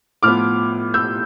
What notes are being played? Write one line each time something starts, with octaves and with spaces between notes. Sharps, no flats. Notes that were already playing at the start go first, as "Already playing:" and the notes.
A2 F3 B3 D6 F6
E6 G6